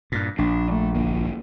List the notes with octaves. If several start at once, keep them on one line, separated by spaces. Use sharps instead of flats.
G2 A#2
A#1 D4
A3
G1 A#3